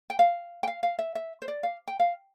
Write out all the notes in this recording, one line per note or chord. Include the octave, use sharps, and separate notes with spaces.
G5
F5
G5
F5
F5
E5
E5
C5
D5
F5
G5
F5